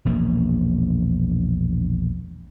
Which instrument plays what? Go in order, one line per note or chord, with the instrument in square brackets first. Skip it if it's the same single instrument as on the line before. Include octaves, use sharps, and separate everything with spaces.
[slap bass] E1 A#1 A#3